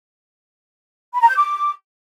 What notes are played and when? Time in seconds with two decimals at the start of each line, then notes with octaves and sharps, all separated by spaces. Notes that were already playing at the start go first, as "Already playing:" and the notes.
1.14 B5
1.21 A#5
1.29 G6
1.36 D6